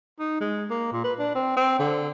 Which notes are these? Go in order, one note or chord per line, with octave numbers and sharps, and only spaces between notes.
D#4
G#3
A#3
A#2
B4
D4
C4
C4
D3